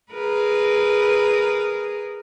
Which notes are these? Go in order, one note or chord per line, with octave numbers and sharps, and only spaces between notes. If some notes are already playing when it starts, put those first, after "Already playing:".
G#4 A#4 B4